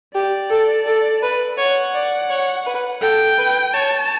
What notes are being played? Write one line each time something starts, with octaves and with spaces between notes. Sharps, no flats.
G4 D5
A4
A4
B4
C#5 F#5
D5
C#5
B4
A4 G5
B4
C#5 A5